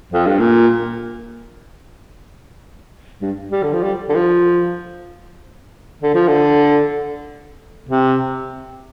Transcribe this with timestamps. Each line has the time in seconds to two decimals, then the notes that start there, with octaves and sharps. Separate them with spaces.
0.12 F2
0.26 G2
0.39 A#2
3.22 G2
3.52 G3
3.63 D3
3.73 F3
3.83 G3
4.09 D3
4.15 F3
6.02 D3
6.15 F3
6.28 D3
7.89 C3